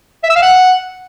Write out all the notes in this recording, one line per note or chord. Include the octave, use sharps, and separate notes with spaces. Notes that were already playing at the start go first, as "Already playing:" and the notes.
E5
E6
F5
F#5